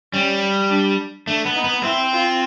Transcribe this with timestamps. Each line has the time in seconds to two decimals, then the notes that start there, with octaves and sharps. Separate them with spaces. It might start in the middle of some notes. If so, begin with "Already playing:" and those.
0.13 G3 C#4
0.70 D4
1.27 A3 D4
1.46 B3
1.56 D#4
1.64 B3
1.83 C4 E4
2.13 F4